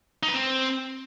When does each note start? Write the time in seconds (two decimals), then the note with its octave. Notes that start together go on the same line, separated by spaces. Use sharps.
0.23 D#4
0.28 B4
0.34 C4